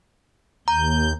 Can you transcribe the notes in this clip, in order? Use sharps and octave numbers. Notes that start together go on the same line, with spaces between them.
D#2 A#5 G6